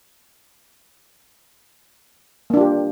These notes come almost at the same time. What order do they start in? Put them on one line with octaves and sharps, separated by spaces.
A#3 D4 F4 G4